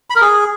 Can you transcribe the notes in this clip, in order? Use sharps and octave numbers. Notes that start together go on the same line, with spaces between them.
B5
A#4
G#4